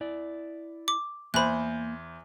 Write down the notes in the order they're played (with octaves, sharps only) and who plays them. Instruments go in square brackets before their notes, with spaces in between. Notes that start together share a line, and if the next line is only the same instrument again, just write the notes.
[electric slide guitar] E4 D5
[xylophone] D6
[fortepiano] E2 C5 [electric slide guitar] A#3 [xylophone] B5 F#6